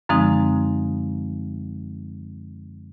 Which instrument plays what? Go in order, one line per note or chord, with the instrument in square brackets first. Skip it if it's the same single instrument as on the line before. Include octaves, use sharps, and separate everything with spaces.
[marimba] F#2 D3 F3 G#3 C4 D#4